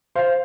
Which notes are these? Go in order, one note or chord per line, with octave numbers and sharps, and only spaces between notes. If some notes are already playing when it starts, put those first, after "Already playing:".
C5 F5